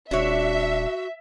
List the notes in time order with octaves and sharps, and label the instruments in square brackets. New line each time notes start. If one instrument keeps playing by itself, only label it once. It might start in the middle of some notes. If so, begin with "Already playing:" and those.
[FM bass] D#1 [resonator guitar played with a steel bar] D4 C#5 [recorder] F#4 [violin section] E5